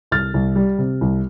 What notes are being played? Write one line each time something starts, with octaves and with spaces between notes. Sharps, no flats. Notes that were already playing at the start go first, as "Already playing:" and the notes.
C2 F6 A6
C2
G3
C3
C2